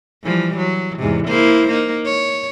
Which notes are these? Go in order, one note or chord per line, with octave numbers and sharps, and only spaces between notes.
E3 F3 G3
F#3
E2 G#2 C3
A#3 E4 C5
A#3 D#4
C#5